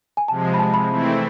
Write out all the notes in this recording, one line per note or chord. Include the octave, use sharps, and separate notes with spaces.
G#5
C3 F3 G#3 A5
B5
A5
B5
E3 A3 C4 E4